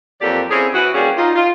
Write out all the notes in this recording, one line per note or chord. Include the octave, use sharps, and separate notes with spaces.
F2 F#3 A#3 G4 A4 D5
C4 C#4 E4 G#4
E3 F#4
F#2 G3 A#3 C#4 G#4
D#4 F4
F4